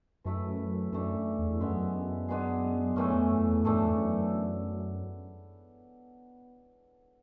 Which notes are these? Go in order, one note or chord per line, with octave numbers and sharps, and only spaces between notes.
F#2 E3 A3 E4 B4
F#2 E3 A3 D4
E2
F#2 G#3 B3 E4
G#3 B3 D4 G#4
F#2 A2 E3 A3 C#4
E2
F#2
E2
G#2 E3 A3 D4 A4
F#2
E2
F#2